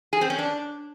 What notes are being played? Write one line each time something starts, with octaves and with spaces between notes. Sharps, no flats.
G#4
C4
C#4
D4